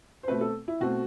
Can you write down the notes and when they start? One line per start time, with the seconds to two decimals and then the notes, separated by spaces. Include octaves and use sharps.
0.23 C5
0.28 B2 A3 C4 B4
0.41 A4
0.68 E4
0.80 B2 A3 C4 F#4